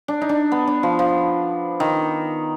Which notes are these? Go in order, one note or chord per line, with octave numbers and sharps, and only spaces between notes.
D4
D#4
D4
B3
D4
F3
F3
D#3